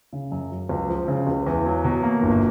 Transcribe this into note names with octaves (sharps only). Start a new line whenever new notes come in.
C#3
F#2
F#3
C#2
F3
C#3
C#2
E2
F#3
B2
A#3
G1